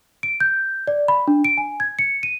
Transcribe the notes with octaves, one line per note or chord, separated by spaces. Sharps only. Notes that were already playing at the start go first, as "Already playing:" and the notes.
D7
G6
D5
B5
D4
D7
G#5
G#6
C#7
D#7